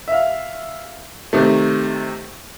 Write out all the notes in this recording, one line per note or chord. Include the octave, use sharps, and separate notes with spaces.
E5 F5
C3 D#3 A3